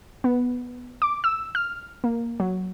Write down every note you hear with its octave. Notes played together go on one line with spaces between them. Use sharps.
B3
D6
E6
F6
A#3
F#3